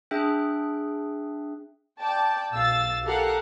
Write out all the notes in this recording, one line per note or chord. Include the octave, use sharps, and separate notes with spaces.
D4 G#4 E5 G5 F#6
D5 G5 A5
B1 F5 E6 A6
G4 A4 A#4 F5 F#5